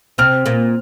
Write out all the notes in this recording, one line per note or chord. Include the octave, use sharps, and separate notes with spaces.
C3 C4 F6
A#2 A#3